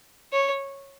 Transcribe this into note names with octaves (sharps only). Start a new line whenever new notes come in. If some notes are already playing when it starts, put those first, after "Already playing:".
C#5